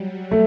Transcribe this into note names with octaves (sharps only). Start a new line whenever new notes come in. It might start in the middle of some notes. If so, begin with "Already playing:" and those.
Already playing: F#3 G3
A3